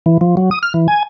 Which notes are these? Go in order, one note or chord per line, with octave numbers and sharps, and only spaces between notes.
E3
F3
F#3
D#6
F6
E3
G#5